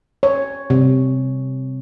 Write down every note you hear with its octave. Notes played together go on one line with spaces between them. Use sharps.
C#5
C3